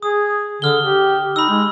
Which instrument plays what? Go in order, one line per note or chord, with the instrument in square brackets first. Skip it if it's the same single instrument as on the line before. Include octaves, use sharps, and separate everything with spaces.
[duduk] G#4 [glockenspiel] D#6
[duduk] D3 [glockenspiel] D#6 F6 G7
[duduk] G4
[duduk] D#4 [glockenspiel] B5 E6
[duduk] G#3